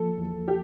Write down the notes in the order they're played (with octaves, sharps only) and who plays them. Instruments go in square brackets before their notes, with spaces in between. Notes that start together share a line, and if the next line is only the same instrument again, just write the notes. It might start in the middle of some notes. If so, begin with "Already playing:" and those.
Already playing: [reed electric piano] F3 A#3 [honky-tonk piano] A4
[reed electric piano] E2
[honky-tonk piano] G4